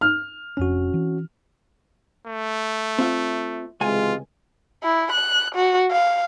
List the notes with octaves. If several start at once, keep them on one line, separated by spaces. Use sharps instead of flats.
F6
F1 F2 C#4 D4 F#4
E3 C4
A3
C4 F4 E5
C#2 C3 E3 G#3 F4 G#5
E4
F#6
F#4
F5